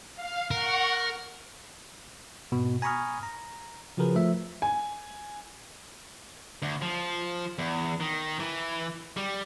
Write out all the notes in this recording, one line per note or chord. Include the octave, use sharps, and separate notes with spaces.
F5
A#4 F#5 C#6
G#2 B2
G#5 A#5 B5 C#6 D#6 F6
A#5
C#3 F3 F#4 G#4 A#4 B4
F3 A3 E5
G#5
D2
F3
E2
D#3
E3
G3